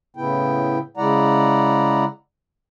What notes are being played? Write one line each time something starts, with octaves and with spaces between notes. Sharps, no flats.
A2 C#3 B3 E4 G5
C#3 G#3 E4 D5 F#5 A#5